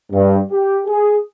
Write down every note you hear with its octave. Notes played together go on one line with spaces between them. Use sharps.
G2
G4
G#4